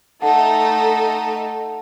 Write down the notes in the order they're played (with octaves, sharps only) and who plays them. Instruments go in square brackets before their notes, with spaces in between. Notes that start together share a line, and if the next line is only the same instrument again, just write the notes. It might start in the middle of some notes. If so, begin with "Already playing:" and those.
[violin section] A3 D#4 A4 [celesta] F#5 A5